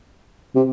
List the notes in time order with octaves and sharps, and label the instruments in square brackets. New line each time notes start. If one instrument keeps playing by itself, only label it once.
[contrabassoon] C3